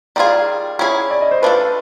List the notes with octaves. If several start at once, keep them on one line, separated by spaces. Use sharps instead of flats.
D#3 G3 C4 F4 G#4 D5
C#4 E4 G#4 C#5
D5
D#5
C5
A3 D4 F4 A4 B4